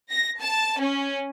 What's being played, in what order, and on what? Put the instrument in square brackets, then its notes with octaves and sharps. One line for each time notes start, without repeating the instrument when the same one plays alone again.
[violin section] A#6
A5
C#4